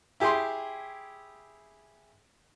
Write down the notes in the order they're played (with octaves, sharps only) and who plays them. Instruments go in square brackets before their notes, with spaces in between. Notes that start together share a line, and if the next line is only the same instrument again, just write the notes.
[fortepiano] E4 G4 G#4 G5 C6